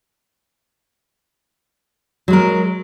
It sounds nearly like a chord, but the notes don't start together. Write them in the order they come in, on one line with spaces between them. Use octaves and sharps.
F#3 G#3 A#4